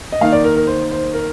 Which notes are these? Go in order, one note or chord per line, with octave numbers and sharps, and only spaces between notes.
D#5
D#3 A#3 D#4 F5
D5
A#4
A#4
C5
C5
A#4